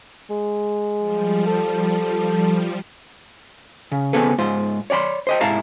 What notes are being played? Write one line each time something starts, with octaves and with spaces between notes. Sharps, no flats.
G#3
F3 G3
A4
C#3
C#3 B3 C4 G#4 A4 B4
G#2 F4 C5
C#5 D5 F#5 B5 C6
C5 D#5 G5
G#2 C3 E4 F5 A5 A#5